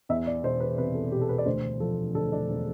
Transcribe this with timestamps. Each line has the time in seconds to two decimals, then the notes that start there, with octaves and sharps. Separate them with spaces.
0.09 E2 E5
0.27 D5
0.44 E1 C5
0.60 B4
0.77 C3 B4
0.95 A4
1.12 E1 G4
1.21 A4
1.29 B4
1.38 D5
1.46 D2 C5
1.80 F3 A4
2.14 D3 A4
2.32 D4
2.48 E1